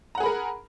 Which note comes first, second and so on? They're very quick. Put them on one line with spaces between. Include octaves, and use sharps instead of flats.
A#5 F#5 G#4 B5 A#4